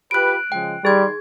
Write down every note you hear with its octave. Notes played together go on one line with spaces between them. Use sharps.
F4 G4 B4 F#6 D7
C#3 F3 G#3 G5
D#3 G3 G#4 C6 G#6